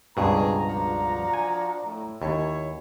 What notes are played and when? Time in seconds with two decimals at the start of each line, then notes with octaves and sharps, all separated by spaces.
0.17 C#2 G2 B2 C4 G4 G#4 A#5
0.69 F3 D4 F#4
1.34 G#5
1.85 A2
2.22 D#2 E4 C#5